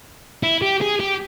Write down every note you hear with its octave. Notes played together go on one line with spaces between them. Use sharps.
E4
G4
G#4
G4